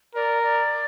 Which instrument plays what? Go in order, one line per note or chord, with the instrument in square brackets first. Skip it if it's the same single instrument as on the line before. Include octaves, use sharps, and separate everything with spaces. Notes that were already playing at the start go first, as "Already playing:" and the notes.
[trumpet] A#4 [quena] D5
[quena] D5